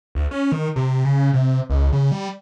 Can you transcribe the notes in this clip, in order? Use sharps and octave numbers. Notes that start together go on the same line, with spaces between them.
D2
C#4
D#3
C3
C#3
C3
C#2
C#3
G3